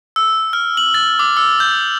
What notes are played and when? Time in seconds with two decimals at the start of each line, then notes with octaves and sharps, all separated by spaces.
0.16 E6
0.53 F6
0.77 F#7
0.94 A6
1.19 D6
1.37 E6
1.60 G6